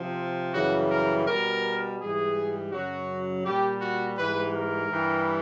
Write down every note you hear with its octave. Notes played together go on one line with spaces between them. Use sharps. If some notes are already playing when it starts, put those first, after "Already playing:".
Already playing: C3 F3
F#2 C#3 E3 G3 F#4
A#4
B2 G3 A#4
G#2 E3 G3 G#4
F#2 C#3 F#3 F#4
A#2 G3 G4
F#4
G#2 E3 G3 B4
A#4
G2 E3 G3